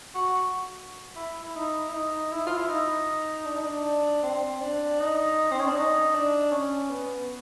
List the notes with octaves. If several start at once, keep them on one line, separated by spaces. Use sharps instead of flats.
F#4
E4
E4
D#4
E4
D#4
E4
F4
E4
D#4
D4
D#4
D4
C4
D4
D#4
C4
C#4
D4
D#4
D4
C#4
B3